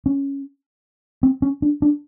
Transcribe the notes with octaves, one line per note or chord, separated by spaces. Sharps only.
C#4
C4
C#4
D4
D4